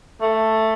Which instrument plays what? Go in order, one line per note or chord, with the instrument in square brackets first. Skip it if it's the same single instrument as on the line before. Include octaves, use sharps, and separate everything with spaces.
[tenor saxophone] A3